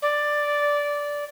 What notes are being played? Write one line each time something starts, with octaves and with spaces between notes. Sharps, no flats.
D5